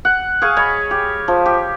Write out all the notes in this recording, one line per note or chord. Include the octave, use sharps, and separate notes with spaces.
F#5
G#4 F5 G#5 C#6
C#5 D#5 B5
G4
F3
G4